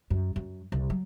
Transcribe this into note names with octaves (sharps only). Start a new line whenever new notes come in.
F#2
F#2
C2
F#3